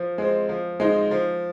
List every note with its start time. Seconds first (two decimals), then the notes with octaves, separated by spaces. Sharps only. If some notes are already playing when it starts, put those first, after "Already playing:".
Already playing: F3
0.18 G#3 C4
0.49 F3
0.80 G#3 C4 D#4
1.11 F3